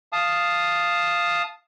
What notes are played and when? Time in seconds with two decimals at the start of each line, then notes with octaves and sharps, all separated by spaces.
0.13 F5 A5 D#6